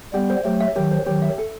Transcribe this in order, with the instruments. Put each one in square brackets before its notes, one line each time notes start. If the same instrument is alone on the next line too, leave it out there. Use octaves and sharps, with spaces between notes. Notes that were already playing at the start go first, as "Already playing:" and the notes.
[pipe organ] G3 B3 [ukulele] G4
[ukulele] C5
[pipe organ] F#3 A3 [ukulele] G4
[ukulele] E5
[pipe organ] D#3 F#3 [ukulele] G4
[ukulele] C5
[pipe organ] D#3 F#3 [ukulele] G4
[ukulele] E5
A4